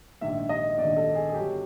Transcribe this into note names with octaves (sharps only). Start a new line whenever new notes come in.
A#1 G#2 D#3 E5
D#5
A#1 G#2 D#3 D5
A4
G#4
G#4
G1 G2 D3 F#3 G4